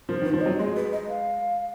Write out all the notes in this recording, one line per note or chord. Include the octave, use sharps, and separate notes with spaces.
F3 A#4
D#3 B4
F3 C#5
D#5
F#3
G#3 D#5
B4
D#5
F5